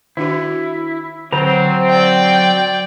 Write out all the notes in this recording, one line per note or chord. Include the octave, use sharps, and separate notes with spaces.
D#3 D4 E4 F#4
D3 F#3 C4 C5 A#5
D5 G5